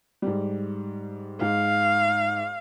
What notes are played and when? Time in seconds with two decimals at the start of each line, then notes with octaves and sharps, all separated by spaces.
0.22 G#2 G3
1.41 G#2 F5